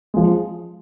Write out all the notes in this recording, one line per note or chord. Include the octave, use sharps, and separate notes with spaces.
F3 G#3